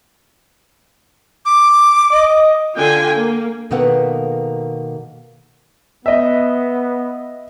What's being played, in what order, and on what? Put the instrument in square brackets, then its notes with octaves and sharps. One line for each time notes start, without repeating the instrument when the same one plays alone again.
[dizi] D6
[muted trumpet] D#5
[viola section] D3 F4 G5 G#5
A#3
[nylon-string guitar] B2 D#3 A#3 A4 B4 F#5
[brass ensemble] B3 [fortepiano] D#5 E5